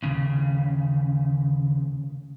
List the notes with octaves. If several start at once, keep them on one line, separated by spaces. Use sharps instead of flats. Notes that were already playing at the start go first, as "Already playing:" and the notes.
D#2 C#3